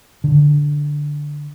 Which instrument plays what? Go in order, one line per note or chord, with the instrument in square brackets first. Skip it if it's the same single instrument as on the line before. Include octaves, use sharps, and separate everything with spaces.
[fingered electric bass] D3